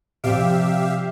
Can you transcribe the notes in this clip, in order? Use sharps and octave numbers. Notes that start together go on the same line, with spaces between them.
C3 F3 G4 D5 E5 F5 D7